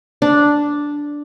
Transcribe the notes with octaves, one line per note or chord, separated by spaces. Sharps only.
D4